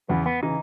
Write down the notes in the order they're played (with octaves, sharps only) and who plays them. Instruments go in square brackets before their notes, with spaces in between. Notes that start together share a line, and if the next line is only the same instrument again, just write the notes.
[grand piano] E2 C#3 E3 [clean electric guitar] B3
[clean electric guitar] B3
[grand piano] C#3 E3 [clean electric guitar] D#4